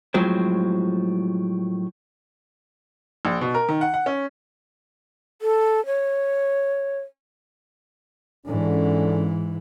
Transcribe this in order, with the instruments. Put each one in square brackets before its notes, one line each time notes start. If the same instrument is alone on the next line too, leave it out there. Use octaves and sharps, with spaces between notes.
[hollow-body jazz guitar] A2 F3 F#3 G#3 C4
[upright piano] A#1
B2
A#4
D#3
F#5
F#5
C#4
[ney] A4
C#5
[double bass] G#2 E3 [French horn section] D3 C#4